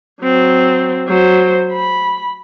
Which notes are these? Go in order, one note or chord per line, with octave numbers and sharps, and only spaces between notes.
F#3 C4
F#3 C5
B5